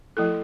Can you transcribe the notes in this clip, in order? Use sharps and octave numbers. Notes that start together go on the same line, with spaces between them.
F3 A3 E4 A4